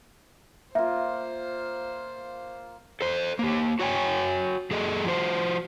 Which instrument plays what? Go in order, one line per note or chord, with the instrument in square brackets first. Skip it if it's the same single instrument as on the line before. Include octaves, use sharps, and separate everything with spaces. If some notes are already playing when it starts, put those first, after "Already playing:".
[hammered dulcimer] A#3 F4 [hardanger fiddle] C5 [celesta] E5
[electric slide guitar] A4 C5
A#3 G4
F#4 C#5 G5 G#5
F#2 G#4 A4 D#5
F3 F#4 C5